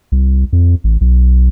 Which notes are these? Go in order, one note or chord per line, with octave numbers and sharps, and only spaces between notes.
C2
F2
A1
B1